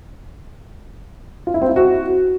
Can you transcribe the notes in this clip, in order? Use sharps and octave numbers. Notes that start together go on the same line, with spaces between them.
F4
E4
C4
E4
F#4